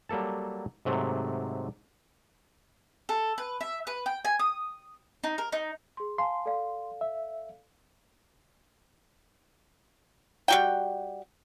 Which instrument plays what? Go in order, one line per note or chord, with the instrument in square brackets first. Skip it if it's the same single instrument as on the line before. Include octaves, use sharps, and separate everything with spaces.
[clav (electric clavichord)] F#3 G3 A#3 A4 A5
G#2 C3 F#3 A3
[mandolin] A4
B4
E5
B4
G5
G#5
D#6
D#4
A#4
D#4
[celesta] G#4 C6
[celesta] F5 G#5 A5 [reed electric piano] C6
[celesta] A4 D5 F5
[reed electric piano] E5
[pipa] G3 F#4 G5